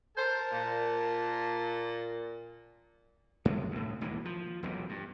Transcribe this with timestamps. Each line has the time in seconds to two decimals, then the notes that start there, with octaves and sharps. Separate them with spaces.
0.18 A#4 C5 A5
0.52 A#2
3.45 F#2 A2 F#3 G#3
3.71 D2 A2
4.01 E1 D#2 E3 A#3
4.25 F3
4.63 E1 B1 A#2
4.89 G2